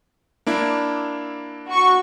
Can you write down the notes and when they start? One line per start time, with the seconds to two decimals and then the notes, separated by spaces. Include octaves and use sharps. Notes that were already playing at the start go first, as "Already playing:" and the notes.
0.47 A#3 D4 E4
1.69 F#4 C#6